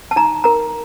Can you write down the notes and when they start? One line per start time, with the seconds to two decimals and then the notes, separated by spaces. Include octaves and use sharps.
0.11 A5
0.16 D#4 A#5
0.44 A#4 A#5